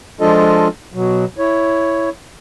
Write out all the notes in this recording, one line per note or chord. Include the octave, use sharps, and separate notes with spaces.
F3 G#3 D4 F4 A4 D#5
B2 F#3
E4 C#5